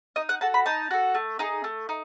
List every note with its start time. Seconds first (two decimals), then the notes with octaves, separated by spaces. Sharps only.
0.16 D#4 D#5
0.29 F#5
0.41 F#4 A4 A5
0.54 B5
0.66 D#4 A5
0.91 F#4 A4
1.15 A3
1.39 D#4 G#4
1.64 A3
1.89 D#4